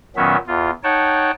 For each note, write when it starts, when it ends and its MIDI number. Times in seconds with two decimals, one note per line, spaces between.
0.16 0.36 46
0.16 0.36 51
0.16 0.36 54
0.16 0.36 59
0.16 0.36 61
0.16 0.36 76
0.47 0.70 40
0.47 0.70 65
0.84 1.31 63
0.84 1.31 73
0.84 1.31 78
0.84 1.31 79
0.84 1.31 81